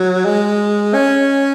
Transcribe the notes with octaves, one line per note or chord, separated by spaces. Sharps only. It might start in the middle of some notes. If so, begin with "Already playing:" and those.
Already playing: F#3
G#3
C#4